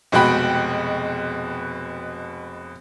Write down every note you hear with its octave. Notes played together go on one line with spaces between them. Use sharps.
F1 B2 G#3 F#4 G5 B5